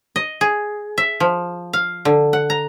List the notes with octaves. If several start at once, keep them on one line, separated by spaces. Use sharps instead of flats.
D#5
G#4
E5
F3
F5
D3
F#5
A#5